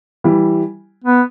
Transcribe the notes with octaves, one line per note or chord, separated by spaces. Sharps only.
E3 G3
B3